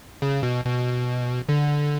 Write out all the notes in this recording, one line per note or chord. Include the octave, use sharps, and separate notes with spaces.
C#3
B2
B2
D3